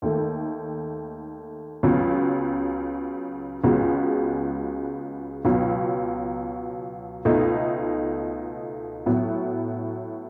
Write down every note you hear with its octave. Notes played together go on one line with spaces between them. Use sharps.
D#2 D#3 A3
C#2 C#3 F#3 B3
C#2 C#3 G#3 B3 F#4
C#2 B2 F#3
C#2 B2 A3 D#4
A2 F#3 B3